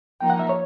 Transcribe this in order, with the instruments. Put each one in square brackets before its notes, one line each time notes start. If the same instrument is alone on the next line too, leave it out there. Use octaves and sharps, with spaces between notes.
[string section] F3 A#3 D#4 [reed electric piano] G5
[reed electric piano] F#5
E5
C#5